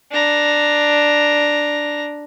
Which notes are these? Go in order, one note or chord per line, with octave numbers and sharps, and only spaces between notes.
D4 A#5